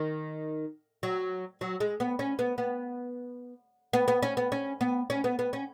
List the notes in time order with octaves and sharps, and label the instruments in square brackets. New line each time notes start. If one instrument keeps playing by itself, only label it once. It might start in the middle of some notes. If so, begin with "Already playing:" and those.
Already playing: [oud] D#3
F#3
F#3
G#3
B3
C#4
B3
B3
B3
B3
C#4
B3
C#4
B3
C#4
B3
B3
C#4